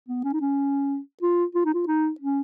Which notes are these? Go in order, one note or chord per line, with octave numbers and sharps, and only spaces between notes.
B3
C#4
D#4
C#4
F4
F4
D#4
F4
D#4
C#4